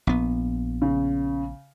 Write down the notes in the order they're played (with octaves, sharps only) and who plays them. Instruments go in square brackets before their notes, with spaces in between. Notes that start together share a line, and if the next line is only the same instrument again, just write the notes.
[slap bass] A#1 B3
[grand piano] C#3